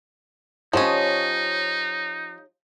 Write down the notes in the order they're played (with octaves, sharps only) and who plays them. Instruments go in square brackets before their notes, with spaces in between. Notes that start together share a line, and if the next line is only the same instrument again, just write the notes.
[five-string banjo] F3 C#4 [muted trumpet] D#4 [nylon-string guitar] G4 C#5 D#5